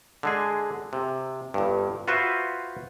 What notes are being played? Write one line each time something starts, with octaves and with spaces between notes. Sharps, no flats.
D3 G#3 G#4
C3
G1 G2
F4 F#4 B4 C5 E5